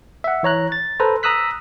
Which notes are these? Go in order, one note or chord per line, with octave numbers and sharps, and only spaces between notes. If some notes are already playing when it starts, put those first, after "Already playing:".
E5 F#5
E3 C#5 A#5 F#6
A6
A4 B4 C5 A#5
A#5 D#6 E6 F#6 B6